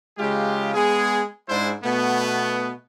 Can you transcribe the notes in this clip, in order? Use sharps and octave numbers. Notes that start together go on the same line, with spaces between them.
C#3 G#3 F4 G4
G#3 B3 G#4
G#2 G#3 D4 E4 C5
B2 A3 B3